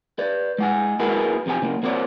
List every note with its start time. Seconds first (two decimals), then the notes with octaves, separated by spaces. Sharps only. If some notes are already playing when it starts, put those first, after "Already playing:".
0.19 B4 D5
0.58 G#3 F#5 G#5
1.00 A#3 E4 F#4 G#4 A#4 B4
1.46 F2 C3 F3 G4 G#5
1.62 C#3 A#3
1.83 A#3 C4 F#4 C#5 D5